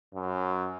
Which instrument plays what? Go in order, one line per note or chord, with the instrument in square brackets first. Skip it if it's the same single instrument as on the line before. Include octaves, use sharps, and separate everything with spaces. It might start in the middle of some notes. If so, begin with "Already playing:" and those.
[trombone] F#2